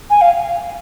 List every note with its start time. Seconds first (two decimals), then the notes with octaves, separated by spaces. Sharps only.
0.10 G#5
0.21 F5